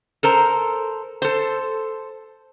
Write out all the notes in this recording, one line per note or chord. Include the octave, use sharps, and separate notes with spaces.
A4 A#4 C5
A4 C5